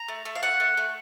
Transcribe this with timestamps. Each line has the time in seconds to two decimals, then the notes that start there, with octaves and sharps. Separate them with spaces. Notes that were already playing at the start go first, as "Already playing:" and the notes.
Already playing: A#5
0.08 A3
0.25 A3
0.36 F5
0.43 A3 F#5
0.60 A3
0.77 A3